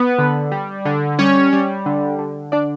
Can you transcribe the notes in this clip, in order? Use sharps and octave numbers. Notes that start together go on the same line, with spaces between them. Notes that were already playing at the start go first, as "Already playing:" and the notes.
Already playing: B3 B4
D3
G3
D3
G3 C#4 C#5
G3
D3
D3
D4 D5